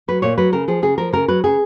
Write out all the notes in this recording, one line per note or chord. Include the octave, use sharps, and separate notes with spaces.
F#3 B4
A#2 C#5
F#3 B4
C#3 A#4
F3 G#4
C#3 G#4
F3 A#4
C#3 A#4
F#3 B4
C#3 G#4